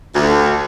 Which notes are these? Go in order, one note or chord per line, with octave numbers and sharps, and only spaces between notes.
D2